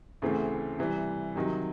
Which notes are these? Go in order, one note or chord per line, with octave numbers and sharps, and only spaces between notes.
D2 C#3 E3 A3 C4
C3 E3 G3
C3 D#3 F#3